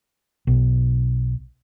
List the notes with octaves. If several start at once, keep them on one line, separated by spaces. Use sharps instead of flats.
B1